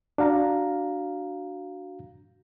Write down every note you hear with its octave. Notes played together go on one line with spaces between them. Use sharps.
D4 F#4 F5 A#5